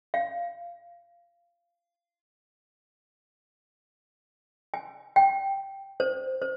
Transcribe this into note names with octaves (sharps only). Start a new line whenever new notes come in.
F5
G#5
G5
C5
C5